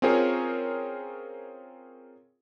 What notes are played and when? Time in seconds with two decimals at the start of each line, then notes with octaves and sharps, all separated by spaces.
0.02 C4 C#4 F4 G#4 A#4 C#5